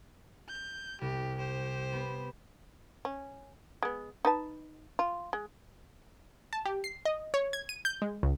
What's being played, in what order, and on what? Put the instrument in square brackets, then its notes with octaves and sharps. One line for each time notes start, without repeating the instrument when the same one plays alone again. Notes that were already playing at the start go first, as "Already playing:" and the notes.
[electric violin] G6
[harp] C2 G3 [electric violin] G4
[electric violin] G4 C5
[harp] B3 B4
[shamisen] C#4
G#3 B3
D#4 B4 A5
F4
G#3
[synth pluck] A5
G4
C7
D#5
C#5
G#6
D#7
G6
G#3
C#2